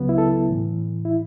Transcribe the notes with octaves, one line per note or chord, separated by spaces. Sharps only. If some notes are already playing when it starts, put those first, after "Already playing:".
Already playing: C#2 C#3 F#3 B3
E4
A4
A2 E3
E4